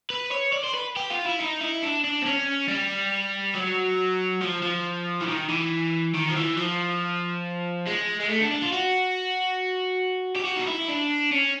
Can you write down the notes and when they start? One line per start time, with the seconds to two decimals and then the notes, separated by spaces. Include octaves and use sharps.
0.10 B4
0.32 C#5
0.53 D5
0.64 C5
0.74 B4
0.97 G4
1.10 F4
1.25 E4
1.39 D#4
1.61 E4
1.83 D4
2.04 D4
2.22 C4
2.26 C#4
2.68 G3
3.55 F#3
4.42 F3
4.63 F3
5.22 E3
5.28 D#3
5.50 E3
6.14 D#3
6.29 F3
6.35 E3
6.57 F3
7.87 G#3
8.20 G#3
8.29 A3
8.41 D4
8.52 D4
8.62 F4
8.72 F#4
10.36 G4
10.45 F#4
10.57 D#4
10.67 E4
10.89 D4
11.32 C#4